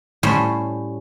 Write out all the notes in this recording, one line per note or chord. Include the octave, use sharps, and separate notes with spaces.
A2 G3 C#4 C5 B5